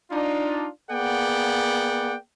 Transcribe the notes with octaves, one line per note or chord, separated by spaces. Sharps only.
D4 D#4 F4
A#3 B3 G#4 D5 F#5 G5